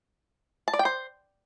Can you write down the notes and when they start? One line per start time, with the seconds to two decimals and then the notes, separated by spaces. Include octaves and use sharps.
0.68 A5
0.73 D5
0.79 G5
0.85 C5